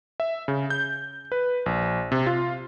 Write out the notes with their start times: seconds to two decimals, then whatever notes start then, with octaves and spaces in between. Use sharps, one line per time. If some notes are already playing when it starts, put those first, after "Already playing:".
0.20 E5
0.48 C#3
0.70 G6
1.32 B4
1.66 A#1
2.12 C3
2.27 F4